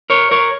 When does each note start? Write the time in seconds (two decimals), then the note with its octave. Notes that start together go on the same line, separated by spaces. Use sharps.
0.10 A#4 C#5
0.31 A#4 C#5